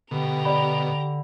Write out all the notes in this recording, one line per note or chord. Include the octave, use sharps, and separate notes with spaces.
B2 D3 G4 A#5
D5 B5